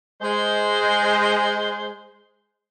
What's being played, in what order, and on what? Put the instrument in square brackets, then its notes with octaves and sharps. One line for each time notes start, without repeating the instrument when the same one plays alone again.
[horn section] G#3 C5